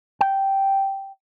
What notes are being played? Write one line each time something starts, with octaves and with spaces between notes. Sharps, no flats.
G5